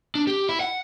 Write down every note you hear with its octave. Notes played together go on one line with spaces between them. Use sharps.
D4
G4
E4
F#5